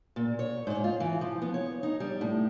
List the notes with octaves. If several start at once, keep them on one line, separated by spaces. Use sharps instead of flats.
A#2
C#5
G#2
F4
E3
F3
B3
C#5
D#4
G3
A2